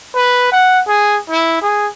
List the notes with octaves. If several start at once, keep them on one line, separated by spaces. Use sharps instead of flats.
B4
F#5
G#4
E4
G#4